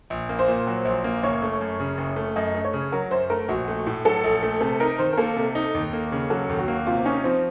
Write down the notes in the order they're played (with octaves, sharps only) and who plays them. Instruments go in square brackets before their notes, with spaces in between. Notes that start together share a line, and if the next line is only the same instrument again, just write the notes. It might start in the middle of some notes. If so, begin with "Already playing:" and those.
[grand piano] A#1
A#3
[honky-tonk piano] C5
[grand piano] A#2
F#3
A#1
A#3
[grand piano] F#1 [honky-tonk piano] C#5
[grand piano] A3
F#2
C#3
F#1
A3
[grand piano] F#2 [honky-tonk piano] D#5
[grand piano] A3
[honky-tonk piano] C#5
[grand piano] C#3
[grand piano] F#3 [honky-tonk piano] A#4
[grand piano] F#2 [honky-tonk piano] C5
[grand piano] A3 [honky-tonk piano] A#4
[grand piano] A#1 [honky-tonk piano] F#4
[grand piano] A3
A2
[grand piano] F#3 [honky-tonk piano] A4
[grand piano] A#1
A3
[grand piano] C3 [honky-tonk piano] A4
[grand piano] D#4 [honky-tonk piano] A#4
[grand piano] D#3 [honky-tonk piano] C5
[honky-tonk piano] A#4
[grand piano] A#3 [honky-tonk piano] A4
[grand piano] C3
D#4
D#2
A#3
C#3
[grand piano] F#3 [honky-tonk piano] A4
[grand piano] D#2
[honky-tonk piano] F#4
[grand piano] A#3
[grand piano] C3 [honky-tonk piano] F4
[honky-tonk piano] C4
[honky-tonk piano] C#4 [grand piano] D#4
[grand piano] F3 [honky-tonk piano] C4